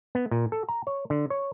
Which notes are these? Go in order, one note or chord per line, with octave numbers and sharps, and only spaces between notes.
B3
A#2
A4
A#5
C#5
D3
C#5